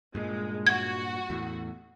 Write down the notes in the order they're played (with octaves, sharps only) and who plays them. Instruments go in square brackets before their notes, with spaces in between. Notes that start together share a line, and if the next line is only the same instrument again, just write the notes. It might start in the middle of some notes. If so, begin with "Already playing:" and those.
[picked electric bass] G2 A#2 [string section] G#3
[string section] F#4 [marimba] G#6
[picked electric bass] E2 A2